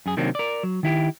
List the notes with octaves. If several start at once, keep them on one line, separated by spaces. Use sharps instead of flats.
F#2 G#4
C3 D#3 F#3 A#3 C4 D4
A#4 D5
F#3
D#3 E4 G4